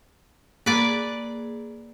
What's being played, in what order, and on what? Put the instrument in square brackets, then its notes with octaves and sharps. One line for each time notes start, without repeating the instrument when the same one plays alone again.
[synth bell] A#3 G#4 [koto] B4 D5